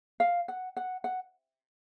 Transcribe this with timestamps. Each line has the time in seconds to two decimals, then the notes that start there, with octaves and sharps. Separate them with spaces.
0.20 F5
0.48 F#5
0.77 F#5
1.04 F#5